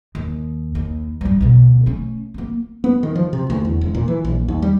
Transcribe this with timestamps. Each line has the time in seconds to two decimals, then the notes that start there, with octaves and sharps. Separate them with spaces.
0.15 D#2
0.75 D#2
1.21 G2 G3
1.41 D2 B2
1.86 A3 C#4
2.34 A#3 C4
2.84 B3
3.03 D#3
3.16 F3
3.33 C3
3.50 D2
3.65 E2
3.81 E1
3.95 A#2
4.08 E3
4.24 A#1
4.48 D#2
4.62 G3